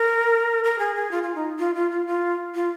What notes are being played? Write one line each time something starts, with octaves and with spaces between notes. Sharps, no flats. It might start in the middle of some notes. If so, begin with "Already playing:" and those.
Already playing: A#4
A#4
G#4
G#4
F4
F4
D#4
F4
F4
F4
F4
F4